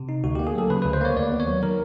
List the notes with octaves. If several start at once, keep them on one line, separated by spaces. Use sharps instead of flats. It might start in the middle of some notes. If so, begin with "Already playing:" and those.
Already playing: C3
D#4
D2 F#4
A#3 G4
G#4
F#3 A4
C#3 B4
D2 B4
C5
A#3 C#5
D#2 D5
B3
C#5
F#3
D#3 A#4